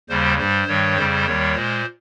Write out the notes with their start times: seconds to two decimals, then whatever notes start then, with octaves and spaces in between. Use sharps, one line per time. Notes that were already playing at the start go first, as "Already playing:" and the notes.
0.09 D#2 C#3 G3 C5
0.38 G2 G3 C5
0.68 G2 D#3 G3 C#5
0.96 F2 C#3 G3 C5
1.26 D#2 D#3 G3 C#5
1.55 A#2 G#3 C5